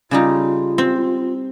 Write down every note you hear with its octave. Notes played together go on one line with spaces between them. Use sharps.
C#3 G3 D#4 F4
C4